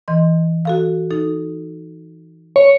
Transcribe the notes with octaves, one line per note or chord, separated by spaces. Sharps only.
E3 D#5 C6
F#4 A4 F5
D#4 A4
C#5